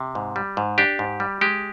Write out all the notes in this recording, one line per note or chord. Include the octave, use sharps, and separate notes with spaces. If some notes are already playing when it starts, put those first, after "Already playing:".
Already playing: C3
G#2
G3
G#2
D4 G4
G#2
G3
G#3 G4